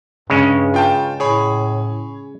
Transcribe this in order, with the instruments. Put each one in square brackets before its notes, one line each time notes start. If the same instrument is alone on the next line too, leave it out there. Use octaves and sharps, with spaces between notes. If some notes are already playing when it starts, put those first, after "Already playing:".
[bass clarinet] G2 [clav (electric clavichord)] C#3 G#3 C#4
[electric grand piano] F4 G5 A5
[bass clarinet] A2 [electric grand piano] G#4 C#5 B5